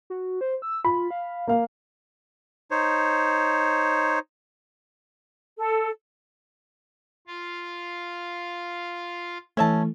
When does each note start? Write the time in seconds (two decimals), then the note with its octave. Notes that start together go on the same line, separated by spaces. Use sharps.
0.10 F#4
0.41 C5
0.62 E6
0.85 F4 B5
1.11 F5
1.48 A#3 F5
2.71 D#4 C5 C#5
5.58 A4
7.27 F4 F5
9.57 E3 A3 C#4 E5 A5